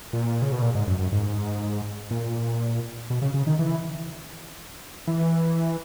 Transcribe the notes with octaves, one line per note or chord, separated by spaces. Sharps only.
A#2
C#3
B2
A#2
G#2
F#2
F#2
G#2
A#2
B2
C#3
C#3
D#3
E3
E3